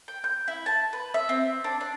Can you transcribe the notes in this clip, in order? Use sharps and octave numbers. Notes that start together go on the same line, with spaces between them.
G5
G6
E4
A5
B4
E5
C4
D4
D4